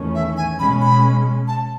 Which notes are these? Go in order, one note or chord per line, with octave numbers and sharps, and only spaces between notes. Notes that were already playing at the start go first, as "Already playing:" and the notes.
Already playing: E2 D#3 A3 C#4
E5
G#5
B2 G#3 C#4 B5
B5
A5